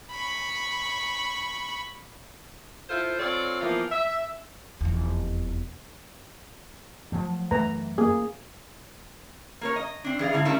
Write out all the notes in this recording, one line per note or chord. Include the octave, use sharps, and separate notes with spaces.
B5 C#6
E4 F4 A4 C5
C4 F4 A4 C#5 D5
E3 F3 A#3 B3 F4
E5
F1 E2
F3 F#3 A3
F#2 E3 A3 B4 A#5
A#3 G#4
A#3 A#4 C#5
D#5
C4 D4
E3 G#4 D5 F5
G#2 D3 E4 F5
D#3 G3 A3 C#4 D4 E4